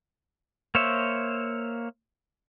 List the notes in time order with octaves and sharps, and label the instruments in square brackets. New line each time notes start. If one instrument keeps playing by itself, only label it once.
[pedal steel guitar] A#3 C5 C#5 E5